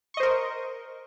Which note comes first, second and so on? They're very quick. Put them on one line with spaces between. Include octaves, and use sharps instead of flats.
C#6 D#5 C5 A#4